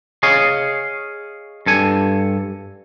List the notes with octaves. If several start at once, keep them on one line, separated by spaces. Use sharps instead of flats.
G#4 C#5 D#5 F5
G2 A4 G#5